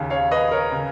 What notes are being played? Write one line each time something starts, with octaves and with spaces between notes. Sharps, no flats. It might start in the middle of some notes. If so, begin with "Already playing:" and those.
Already playing: D#2 C#3
C#5 F5
B4 D#5
A#4 C#5
C#3